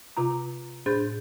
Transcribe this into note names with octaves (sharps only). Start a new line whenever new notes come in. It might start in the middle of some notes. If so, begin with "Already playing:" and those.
C3 F4 A#5
A2 D4 G#4 C5 G6 A6